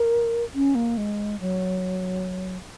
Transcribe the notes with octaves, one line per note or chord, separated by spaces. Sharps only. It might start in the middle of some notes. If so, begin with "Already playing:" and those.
Already playing: A#4
C#4
A#3
G#3
F#3